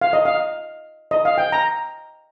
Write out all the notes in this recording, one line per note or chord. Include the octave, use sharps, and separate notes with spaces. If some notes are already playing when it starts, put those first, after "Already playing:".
F5
D#5
F5
D#5
F5
G5
A#5